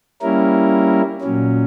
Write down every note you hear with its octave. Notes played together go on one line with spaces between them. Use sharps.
G3 A#3 C#4 E4 A#4
A#2 F#3 C#4